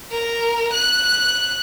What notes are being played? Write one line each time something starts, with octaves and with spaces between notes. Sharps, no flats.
A#4
F#6